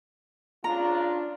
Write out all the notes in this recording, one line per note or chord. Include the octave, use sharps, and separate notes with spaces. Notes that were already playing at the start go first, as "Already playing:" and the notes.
C#3 D4 F4 A#5